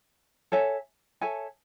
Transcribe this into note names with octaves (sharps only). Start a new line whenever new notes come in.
A4 C#5 E5 G#5
A4 C#5 E5 G#5